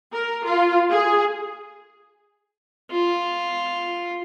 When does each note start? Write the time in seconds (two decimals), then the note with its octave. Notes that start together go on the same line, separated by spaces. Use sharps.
0.12 A#4
0.44 F4
0.89 G#4
2.91 F4